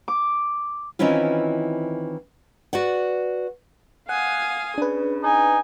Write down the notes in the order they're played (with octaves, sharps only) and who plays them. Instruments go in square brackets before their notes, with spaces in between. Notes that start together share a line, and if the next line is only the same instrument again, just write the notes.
[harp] D6
[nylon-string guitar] D#3 E3 C4 C#4 E4 F4
F#4 B4 D5 F#5
[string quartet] F5 G#5 D#6 [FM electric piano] F#5
[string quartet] C#3 [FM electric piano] D4 B4
[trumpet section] D#4 G#5